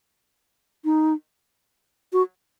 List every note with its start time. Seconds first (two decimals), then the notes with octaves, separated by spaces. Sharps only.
0.85 D#4
2.13 F#4